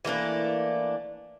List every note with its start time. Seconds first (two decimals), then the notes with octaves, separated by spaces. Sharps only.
0.05 E3 A3 A#3 D4